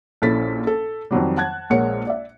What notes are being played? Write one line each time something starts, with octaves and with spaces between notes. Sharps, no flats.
A#1 C#4 E4 A4 A6 B6
A4
F2 D#3 F#3 G3
F#5 A5 F#6 G#6
A#1 G#3 A#3 C#5 F#5 C#7
D5 E5